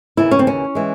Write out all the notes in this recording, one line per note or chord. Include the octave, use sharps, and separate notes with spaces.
D#2 C#3 E3 E4
C#4
C4
C#4
E3 G#3